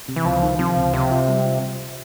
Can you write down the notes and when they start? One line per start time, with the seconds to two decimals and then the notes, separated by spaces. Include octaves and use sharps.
0.08 C3
0.16 E3
0.25 C#2 F3
0.42 D#3
0.59 C3 F3
0.76 C#2
0.94 C3 C4
1.11 F4
1.28 G3